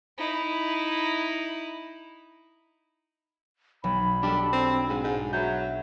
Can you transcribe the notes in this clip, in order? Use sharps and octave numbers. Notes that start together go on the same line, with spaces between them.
D#4 E4
B1 B5
G3 D4 A4
C4
G#2
G#2
F#3 B4 E5 G6